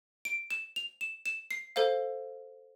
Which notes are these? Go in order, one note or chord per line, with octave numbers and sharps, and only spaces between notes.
D7
E7
F7
E7
E7
C7
A4 C5 F5